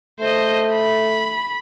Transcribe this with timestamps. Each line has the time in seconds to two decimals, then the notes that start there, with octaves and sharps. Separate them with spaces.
0.20 A3 C5 D#5
0.73 B5